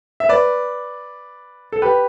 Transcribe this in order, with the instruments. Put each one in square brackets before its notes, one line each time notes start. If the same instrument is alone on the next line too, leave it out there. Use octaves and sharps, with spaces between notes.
[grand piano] E5
B4 D5
A4
G4 B4